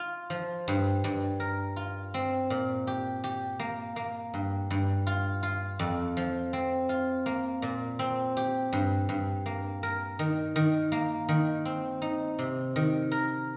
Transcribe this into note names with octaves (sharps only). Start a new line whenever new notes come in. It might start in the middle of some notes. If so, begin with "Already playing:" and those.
Already playing: F4
F3
G2
G2
A#4
F4
C4
A#2
G4
G4
A#3
A#3
G2
G2
F4
F4
F2
F3
C4
F4
A#3
A#2
C4
G4
G2
G2
A#3
A#4
D#3
D#3
A#3
D#3
C4
D#4
C3
D#3
A#4